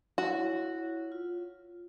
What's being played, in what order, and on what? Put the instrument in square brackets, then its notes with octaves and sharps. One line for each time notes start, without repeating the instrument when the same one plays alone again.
[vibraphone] E4 C#5 [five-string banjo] F#4
[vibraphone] F4